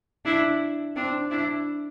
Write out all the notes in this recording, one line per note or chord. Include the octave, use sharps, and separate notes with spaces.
D4 E4
C4 D4
D4 E4